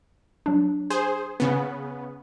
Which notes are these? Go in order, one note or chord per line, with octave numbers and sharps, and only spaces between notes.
F#3 D4
G#4 C5
C#3 B3